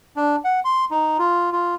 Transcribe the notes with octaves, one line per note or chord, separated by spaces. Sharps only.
D4
F#5
C6
D#4
F4
F4